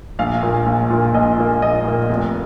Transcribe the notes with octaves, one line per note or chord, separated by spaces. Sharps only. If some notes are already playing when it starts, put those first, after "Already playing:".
A#1 F5
A#2 A#3
A#1
A#2 A#3
A#1 D#5
A#2 A#3
A#1 D#5
A#2 A#3
F1